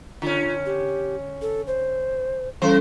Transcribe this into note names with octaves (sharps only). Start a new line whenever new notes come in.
D3 C#4 F4
G4
A4
C5
E3 G3 C#4 A4 C5